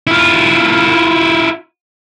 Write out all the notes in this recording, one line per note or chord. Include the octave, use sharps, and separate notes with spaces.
E4 F4